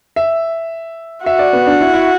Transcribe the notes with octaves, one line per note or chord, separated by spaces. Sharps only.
E5
F#4 E5
D5
B3
D4
E4
E4